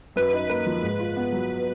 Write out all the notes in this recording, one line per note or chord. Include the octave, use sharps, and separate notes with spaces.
F#2 B4
D#4
A#3 B4
F3
G#2
F4
B3
F#3